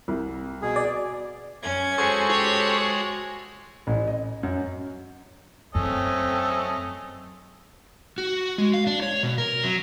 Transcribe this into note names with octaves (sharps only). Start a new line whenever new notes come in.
C2
B2 G#4
D5
F#2 C#4 G#6
G#3 F#4 G#4 A4 C5 C#6
G4 C#5
A1
D#5
F#2
F#2 A3 C4 C#4 A4 D#5
F#4
G#3
F5
D4
C#5
B2
A#4
F#3